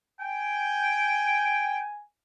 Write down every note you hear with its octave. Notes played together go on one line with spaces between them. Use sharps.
G5 G#5